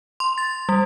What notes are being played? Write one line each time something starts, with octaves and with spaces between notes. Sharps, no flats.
C6
A6
G3